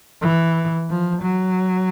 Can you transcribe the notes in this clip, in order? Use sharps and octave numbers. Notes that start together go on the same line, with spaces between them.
E3
F3
F#3